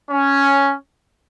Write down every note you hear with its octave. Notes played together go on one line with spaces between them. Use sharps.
C#4